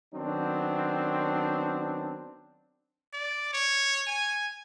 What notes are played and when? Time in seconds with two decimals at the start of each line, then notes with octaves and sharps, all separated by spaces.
0.14 D#3 F#3 B3 C4 D4
3.13 D5
3.53 C#5
4.07 G#5